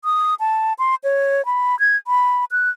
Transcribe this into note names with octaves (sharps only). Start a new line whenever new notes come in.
D#6
A5
C6
C#5
B5
G#6
B5
F#6